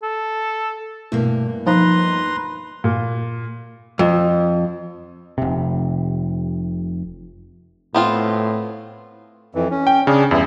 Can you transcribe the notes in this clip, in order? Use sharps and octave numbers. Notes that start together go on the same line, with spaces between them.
A4
E2 G2 B2 A3 A#3 E4
F3 D#4 B4 A#5 C6
A#2
F2
F1 C3
A2 B3 C4 F4
F2 E3
C#4
G5
C#3 D4 G#4
E2 G2 C#3 E4